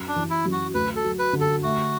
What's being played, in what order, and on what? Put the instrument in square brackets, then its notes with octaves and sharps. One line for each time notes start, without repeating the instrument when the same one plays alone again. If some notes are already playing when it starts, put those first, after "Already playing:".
Already playing: [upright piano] F#2
[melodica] D4
[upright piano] E3
[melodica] E4
[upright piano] F#2
[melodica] F#4
[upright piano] D2 [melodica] B4
[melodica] A4
[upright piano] F#3
[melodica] B4
[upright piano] D3
[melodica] A4
[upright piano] A3 [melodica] F#4